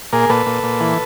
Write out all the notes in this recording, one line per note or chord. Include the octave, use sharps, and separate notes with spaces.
A#2 G#4 A#4
A#2 A4 B4
A#2
A#2
E3